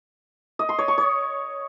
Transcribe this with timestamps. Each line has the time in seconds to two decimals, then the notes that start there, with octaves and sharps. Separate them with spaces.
0.59 D#5
0.69 C6
0.79 C#5
0.88 C#6
0.98 C#5